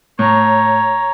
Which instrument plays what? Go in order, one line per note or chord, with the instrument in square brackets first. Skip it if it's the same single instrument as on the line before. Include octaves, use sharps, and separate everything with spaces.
[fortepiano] A2 [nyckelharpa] C#5 A#5